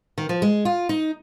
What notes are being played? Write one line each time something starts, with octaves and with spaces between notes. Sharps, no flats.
D#3
F3
G#3
F4
D#4